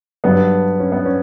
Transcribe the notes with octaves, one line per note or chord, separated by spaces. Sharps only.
G2 D3 F#3 B3
C#4
B3
C#4